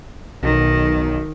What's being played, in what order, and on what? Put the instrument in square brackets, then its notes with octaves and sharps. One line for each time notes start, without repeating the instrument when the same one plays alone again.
[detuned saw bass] B1 [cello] D#3